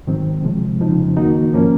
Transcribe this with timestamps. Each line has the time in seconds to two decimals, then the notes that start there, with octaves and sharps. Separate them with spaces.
0.07 G#2 D#3 F#3 C4
0.43 C3 F3 G#3
0.80 F2 C#3 F3 C4 D#4
1.16 D#3 A#3 D#4 F#4
1.53 G#2 F3 A#3 C#4